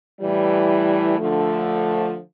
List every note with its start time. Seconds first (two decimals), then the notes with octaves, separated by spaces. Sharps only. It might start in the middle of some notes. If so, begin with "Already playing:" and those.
0.21 A2 E3 G3
1.19 D3 F3 A3